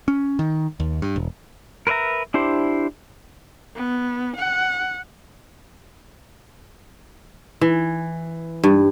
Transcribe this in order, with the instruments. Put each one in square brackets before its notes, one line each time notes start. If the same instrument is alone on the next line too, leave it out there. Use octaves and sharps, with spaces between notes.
[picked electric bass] C#4
D#3
D#2
G2
E1
[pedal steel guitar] A#4 B4 C#5 E5 A#5
D4 E4 G4 C5
[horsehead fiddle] B3
F#5
[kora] E3
G2